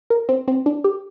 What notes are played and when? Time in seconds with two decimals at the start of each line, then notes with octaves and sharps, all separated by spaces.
0.10 A#4
0.29 C4
0.48 C4
0.66 D4
0.84 G4